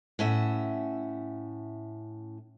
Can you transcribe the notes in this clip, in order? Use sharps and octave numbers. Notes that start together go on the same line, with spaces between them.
A2 C#4 E5 F#5